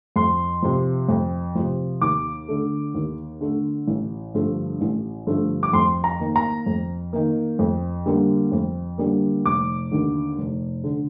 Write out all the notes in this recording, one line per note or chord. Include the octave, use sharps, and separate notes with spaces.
F2 C6
C3 F3
F2
C3 F3
D#2 D6
D3 A3
D#2
D3 A3
A1
G2 D3 F3 A3
A1
G2 D3 F3 A3
D6
F2 C6
A#5
D#3 A#3
A#5
F2
D#3 A#3
F2
D3 G3 A#3
F2
D3 G3 A#3
F1 D6
D#2 D3
F1
D3